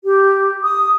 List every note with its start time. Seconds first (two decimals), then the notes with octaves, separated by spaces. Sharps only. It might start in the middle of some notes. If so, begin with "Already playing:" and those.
0.03 G4
0.64 D#6